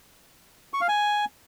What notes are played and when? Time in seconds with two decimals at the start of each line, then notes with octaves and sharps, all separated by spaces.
0.73 C#6
0.81 F5
0.88 G#5